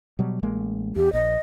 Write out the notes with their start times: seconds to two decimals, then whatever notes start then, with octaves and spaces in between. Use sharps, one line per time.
0.19 B2 F#3 G3
0.43 A1 G#3 A#3
0.96 E2 G4
1.13 A#1 D#5